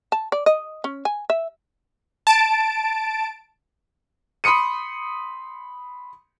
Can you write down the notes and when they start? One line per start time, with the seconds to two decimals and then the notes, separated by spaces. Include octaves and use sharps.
0.12 A5
0.32 D5
0.46 D#5
0.84 C#4
1.05 G#5
1.30 E5
2.27 A5 D7
4.44 B5 C6 D#6 C#7 D#7